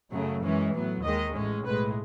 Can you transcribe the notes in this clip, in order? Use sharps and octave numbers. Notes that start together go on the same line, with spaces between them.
F#2 C#3 F#3 A3
F#2 E3 G#3 C#4
A2 F#3 B3
D#2 D#3 G#3 D#5
A1 A2 G#3 C#4
B1 A2 G#3 B4